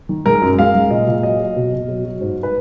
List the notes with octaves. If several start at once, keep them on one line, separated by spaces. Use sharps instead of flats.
D#3
G#3 A#4
F#2
G#3 F5
G#3
A#2 D#5
A#2
F#3 D#5
F#3
B2
B2
F#3
F#3
G#2
B4